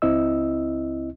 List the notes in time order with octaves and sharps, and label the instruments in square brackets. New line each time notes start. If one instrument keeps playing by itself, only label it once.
[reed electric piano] C#2 C4 E4 D#5 E6